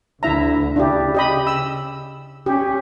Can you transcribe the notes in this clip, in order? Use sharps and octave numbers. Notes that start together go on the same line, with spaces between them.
D2 D3 E4 E5 A#5
C#3 D4 E4 G4
G4 D#5 B5
E6
C#4 G4